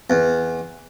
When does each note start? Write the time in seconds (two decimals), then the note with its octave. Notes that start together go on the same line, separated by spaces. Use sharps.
0.10 E2